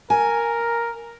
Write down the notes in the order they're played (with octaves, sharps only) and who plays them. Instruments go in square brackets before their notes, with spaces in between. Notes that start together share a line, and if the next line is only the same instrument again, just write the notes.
[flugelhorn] A#4 [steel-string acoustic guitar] G#5